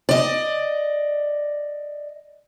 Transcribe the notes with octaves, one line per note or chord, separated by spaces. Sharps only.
D5 D#5